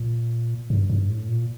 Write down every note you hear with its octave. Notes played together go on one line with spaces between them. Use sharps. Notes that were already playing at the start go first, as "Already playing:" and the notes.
Already playing: A#2
G2
G2
A2
A#2